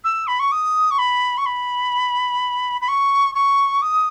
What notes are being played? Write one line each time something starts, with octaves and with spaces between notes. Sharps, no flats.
E6
B5
C#6
D#6
C#6
B5
C#6
B5
B5
C#6
C#6
D#6